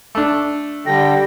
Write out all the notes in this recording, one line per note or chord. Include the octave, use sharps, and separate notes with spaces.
A3 D4
D3 G3 A4 G5 A#6